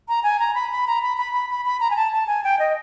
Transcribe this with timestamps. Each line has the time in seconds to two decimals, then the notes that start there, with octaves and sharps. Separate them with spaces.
0.08 A#5
0.23 G#5
0.39 A#5
0.55 B5
0.71 B5
0.87 A#5
1.03 B5
1.17 B5
1.33 B5
1.50 B5
1.65 B5
1.80 A#5
1.91 G#5
1.96 A5
2.13 A5
2.27 G#5
2.44 G5
2.59 D#5